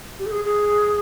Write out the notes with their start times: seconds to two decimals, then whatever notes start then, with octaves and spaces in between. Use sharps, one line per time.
0.19 G4
0.26 A4
0.32 G#4
0.45 G#4